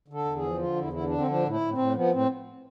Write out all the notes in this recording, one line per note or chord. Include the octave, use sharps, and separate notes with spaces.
D3
A4
E2
G#4
F3
D3 F4
E2
E4
D3 E4
D4
D3
C4
F3 D4
A2
E4
A2
C4
A2
F3 B3
A2 C4